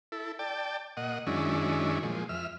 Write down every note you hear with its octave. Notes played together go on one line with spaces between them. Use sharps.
E4 A4
D5 G5 A5
A#2 D#5 F#5
F#2 D#3 G#3 C#4 D4 E4
A#2 F3 G#3
F2 E5 F6